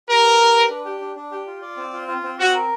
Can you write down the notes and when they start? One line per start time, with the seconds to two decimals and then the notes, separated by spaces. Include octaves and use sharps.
0.08 G4 A#4
0.23 B4
0.39 G4
0.54 B4
0.70 D4
0.85 G4
1.01 D4
1.16 D4
1.31 G4
1.47 F4
1.62 D5
1.77 C4
1.93 F4
2.08 F4
2.24 C4
2.38 C4 F#4
2.54 A#4